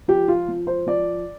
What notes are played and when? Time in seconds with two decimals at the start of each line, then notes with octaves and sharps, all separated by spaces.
0.08 F3 G4
0.28 F4
0.49 F3
0.67 C5
0.87 F3 D5